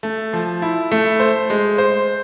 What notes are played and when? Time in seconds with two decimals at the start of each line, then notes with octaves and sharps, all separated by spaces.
0.03 A3
0.33 F3
0.62 E4
0.91 A3
1.20 C5
1.50 G#3
1.78 C5